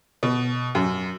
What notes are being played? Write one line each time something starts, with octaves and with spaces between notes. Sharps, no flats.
B2
F#2